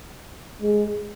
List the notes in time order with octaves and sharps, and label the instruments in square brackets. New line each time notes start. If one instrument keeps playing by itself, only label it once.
[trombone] G#3